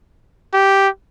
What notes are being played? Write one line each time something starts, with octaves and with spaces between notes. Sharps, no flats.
G4